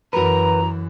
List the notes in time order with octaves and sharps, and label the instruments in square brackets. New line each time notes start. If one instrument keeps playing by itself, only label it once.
[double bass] F#2 E3 [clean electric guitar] F#4 A#4 B4 [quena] A#5